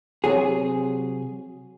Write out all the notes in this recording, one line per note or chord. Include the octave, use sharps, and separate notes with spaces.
C3 F#3 G#4